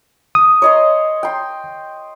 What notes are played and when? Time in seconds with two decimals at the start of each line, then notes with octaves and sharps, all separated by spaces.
0.35 D#6
0.62 C#5 D#5 C6
1.23 G5 C6